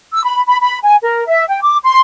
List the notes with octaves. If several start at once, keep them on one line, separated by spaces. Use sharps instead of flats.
E6
B5
B5
B5
G#5
A#4
E5
G5
D6
C6